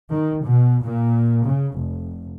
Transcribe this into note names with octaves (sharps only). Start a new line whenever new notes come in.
D#3
B2
A#2
C#3
F1